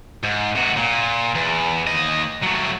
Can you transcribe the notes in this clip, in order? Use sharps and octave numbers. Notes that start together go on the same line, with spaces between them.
G#2
C3 F#4
A#2
E2
D#2 D#5
F#3 A3